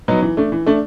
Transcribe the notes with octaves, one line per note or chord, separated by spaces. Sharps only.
F#3 B3 D#4
E3
A3 D4
E3
A3 D4